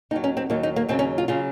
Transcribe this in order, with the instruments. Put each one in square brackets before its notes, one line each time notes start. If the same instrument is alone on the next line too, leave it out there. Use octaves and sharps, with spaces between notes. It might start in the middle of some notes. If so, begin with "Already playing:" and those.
[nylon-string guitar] D#2 D#3 F#3 D#4
C#4
C4
D#2 D#3 F#3 A#3
D#4
A#3
D#2 C#3 F#3 C4
C#4
F4
C#3 F#3 F4